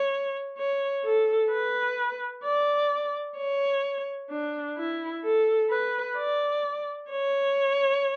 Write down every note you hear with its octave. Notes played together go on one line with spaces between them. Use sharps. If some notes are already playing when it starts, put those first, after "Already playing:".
Already playing: C#5
C#5
A4
B4
D5
C#5
D4
E4
A4
B4
D5
C#5